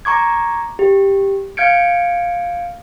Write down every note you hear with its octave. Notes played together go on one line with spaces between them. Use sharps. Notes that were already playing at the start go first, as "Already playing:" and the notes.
A#5 C#6 D6 G#6
G4
F5 F6 G6 G#6 C#7 D7